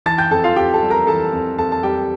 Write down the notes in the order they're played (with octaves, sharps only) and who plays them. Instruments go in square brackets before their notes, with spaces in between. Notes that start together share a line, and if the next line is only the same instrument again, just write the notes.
[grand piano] E3 A5 A6
G5 G6
F2 A4 A5
F4 F5
F2 G4 G5
A4 A5
G3
A#4 A#5
E3 A4 A5
F2
F2 A4 A5
A5
G3 G4 G5